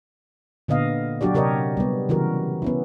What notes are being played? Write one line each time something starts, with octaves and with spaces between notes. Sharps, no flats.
A#2 D3 B3 D#5 F5
F#3 D4 F#4 G4 D5
C3 G4 A#4 C#5 D#5
G3 B3
C#3 E3 F#4 A#4
B3 C#4 E4